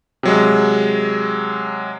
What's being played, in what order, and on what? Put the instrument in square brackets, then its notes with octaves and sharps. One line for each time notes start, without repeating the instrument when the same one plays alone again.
[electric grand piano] C3 F#3 G#3